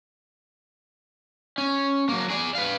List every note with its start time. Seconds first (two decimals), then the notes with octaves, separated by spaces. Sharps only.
1.58 C#4
2.09 F#3 A#3
2.30 G#4 D5
2.55 B4 F5